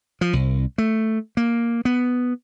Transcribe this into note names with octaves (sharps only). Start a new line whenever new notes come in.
F3
C2
A3
A#3
B3